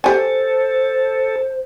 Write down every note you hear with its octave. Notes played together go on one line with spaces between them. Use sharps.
G4 A4 C5 G#5